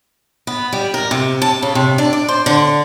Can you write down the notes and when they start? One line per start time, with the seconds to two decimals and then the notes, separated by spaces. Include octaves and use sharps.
0.47 B3
0.73 G3
0.94 A#4
1.11 C3
1.42 A5
1.62 C#3
1.75 C3
1.98 D4
2.13 D5
2.28 C5
2.46 D3